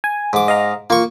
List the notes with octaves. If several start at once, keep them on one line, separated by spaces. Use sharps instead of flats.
G#5
G#2 D6
D#5 F5 A#5
A#3 F4 C#6